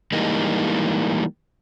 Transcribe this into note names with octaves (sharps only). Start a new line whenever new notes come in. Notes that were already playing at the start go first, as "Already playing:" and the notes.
E3 G3 G#3 A#3 D#4